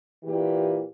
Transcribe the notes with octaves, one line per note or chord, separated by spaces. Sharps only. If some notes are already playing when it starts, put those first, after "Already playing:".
A#2 E3 G4